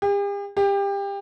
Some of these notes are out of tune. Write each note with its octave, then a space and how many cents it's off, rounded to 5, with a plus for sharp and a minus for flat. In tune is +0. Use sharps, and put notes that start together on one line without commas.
G4 +45
G4 +25